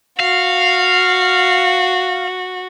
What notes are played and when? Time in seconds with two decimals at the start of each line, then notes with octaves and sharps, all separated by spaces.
0.20 F#4 F5